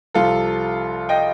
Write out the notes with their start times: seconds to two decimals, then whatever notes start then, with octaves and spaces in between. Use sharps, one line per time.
0.14 C2 C3 F3 F4 A4
1.09 D#5 G5